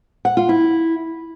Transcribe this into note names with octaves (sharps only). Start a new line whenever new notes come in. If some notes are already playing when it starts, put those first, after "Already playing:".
F#5
F4
E4